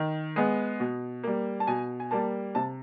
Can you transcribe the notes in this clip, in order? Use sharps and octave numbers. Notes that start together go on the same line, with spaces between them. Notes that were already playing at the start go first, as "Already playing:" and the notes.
Already playing: D#3
G#3 B3
B2
G3 A#3
A5
B2 G#5
G#5
G3 A#3 A5
C3 A5